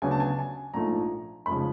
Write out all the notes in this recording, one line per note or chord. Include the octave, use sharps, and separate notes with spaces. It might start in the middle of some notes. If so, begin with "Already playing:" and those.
D2 C#3 F#3 B3 D4 G#5
A5
G#5
A5
G#5
A#1 G#2 F3 A3 A#5
F1 C#3 F3 G#3 B5